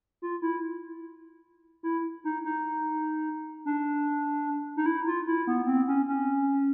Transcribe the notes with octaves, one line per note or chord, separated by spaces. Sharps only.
F4
E4
E4
D#4
D#4
D4
D#4
E4
F4
E4
B3
C4
C#4
C#4